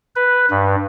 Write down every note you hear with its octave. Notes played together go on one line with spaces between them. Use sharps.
B4
G2